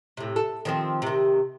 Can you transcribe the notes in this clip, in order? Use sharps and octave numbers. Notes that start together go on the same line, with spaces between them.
A2 C3
A4
D#3 F3 C4
C3 D#3